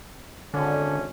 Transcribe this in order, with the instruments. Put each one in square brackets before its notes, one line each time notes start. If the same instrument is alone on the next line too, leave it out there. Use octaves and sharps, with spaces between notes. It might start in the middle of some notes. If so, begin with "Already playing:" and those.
[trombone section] G#1 C#4 D4 [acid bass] D3